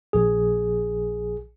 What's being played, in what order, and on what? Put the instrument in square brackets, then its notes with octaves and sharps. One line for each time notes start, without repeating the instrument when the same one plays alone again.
[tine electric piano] A#1 G#4